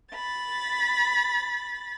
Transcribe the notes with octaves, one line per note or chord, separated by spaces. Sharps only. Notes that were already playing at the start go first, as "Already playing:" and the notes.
B5 A6